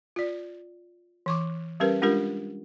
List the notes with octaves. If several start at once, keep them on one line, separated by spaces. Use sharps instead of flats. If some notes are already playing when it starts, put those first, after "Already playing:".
F4 D5
E3 C#6 D6
G3 C#4 G4 A#4 B4
G#3 D4 F4 G4 A#4